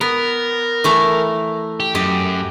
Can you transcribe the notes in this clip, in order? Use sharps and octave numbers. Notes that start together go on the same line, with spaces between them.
B3 A#4
E3 A3 A#5
G4
F#2 G4 D#5